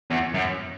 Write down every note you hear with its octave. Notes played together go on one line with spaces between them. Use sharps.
E2
F#2